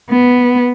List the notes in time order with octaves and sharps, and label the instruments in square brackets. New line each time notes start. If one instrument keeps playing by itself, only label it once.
[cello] B3